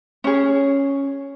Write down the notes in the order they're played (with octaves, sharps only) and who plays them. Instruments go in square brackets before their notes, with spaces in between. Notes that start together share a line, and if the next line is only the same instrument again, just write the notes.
[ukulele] C#4 G#4